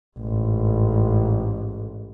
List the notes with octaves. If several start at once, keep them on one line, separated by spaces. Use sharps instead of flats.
A1 G#2